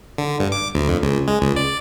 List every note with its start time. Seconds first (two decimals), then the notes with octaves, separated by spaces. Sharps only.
0.18 D3
0.40 G2
0.52 D6
0.75 D2
0.89 F2
1.02 C#2
1.27 G#3
1.42 C#2
1.56 D5